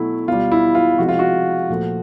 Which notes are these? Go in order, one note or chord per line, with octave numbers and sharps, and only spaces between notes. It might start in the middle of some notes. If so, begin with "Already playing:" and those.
Already playing: B2 F#3 A3 E4
B2 G3 F4
E4
F4
C3 F3 G#3 F#4
F4
F#4
A#2 F3 A3